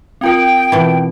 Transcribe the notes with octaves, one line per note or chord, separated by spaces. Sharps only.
C4 F4 A#4 G5
B2 E3